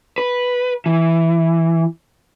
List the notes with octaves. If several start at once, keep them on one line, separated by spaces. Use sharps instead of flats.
B4
E3